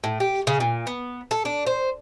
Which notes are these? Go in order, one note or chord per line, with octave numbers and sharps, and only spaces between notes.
A2
G4
C#3
A#2
B3
A4
D4
C5